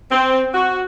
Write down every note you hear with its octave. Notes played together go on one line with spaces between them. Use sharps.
C4
F#4